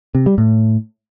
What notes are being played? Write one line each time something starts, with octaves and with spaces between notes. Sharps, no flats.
C3
G3
A2